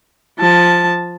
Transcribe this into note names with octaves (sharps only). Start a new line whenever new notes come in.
F3 A5